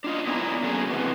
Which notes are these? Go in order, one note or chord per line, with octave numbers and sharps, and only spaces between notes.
D4 F4 D#5
F#3 B3 E4 D5 G#5 A#5
C#3 F#3 A3 A#3 F4 G#4
C3 E3 B3